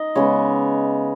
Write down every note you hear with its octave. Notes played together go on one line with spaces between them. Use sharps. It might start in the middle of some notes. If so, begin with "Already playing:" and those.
Already playing: D#4 D#5
C#3 G#3 B3 C#5